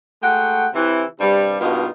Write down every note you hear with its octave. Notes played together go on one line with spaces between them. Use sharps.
G#3 A3 F#4 F#5 G5
C3 E3
G2 C3 G3
G2 B2 A#3 D#4 F4